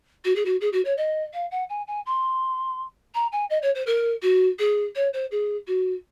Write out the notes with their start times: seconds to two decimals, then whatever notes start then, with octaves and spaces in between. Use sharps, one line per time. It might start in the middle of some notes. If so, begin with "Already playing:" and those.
0.25 F#4
0.35 G#4
0.45 F#4
0.61 G#4
0.73 F#4
0.85 C#5
0.97 D#5
1.33 F5
1.51 F#5
1.69 G#5
1.87 G#5
2.06 C6
3.14 A#5
3.32 G#5
3.50 D#5
3.62 C#5
3.75 C5
3.86 A#4
4.22 F#4
4.59 G#4
4.95 C#5
5.13 C5
5.31 G#4
5.67 F#4